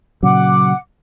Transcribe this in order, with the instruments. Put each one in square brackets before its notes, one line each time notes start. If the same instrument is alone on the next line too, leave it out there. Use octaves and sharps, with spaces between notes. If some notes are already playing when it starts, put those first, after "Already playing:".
[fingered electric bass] A#2 C#3 F#3 [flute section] F#5 D6